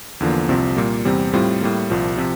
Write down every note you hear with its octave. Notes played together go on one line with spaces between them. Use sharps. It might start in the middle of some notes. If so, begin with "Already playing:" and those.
E2 D3 F3 A#3
C2 C3 F3 C4
A#2 G3 A#3
E2 C3 G3 C4
A2 G3 C4 F4
A2 G3 A#3
C2 A#2 F3
C3 F3